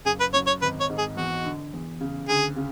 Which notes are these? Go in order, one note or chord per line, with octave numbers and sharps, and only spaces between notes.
F#1 G#4
B4
F#2 C#5
C#5
G#1 B4
C#5
G#2
G#4
E2 F#4
D3
E2
C#3
D2 G#4
C#3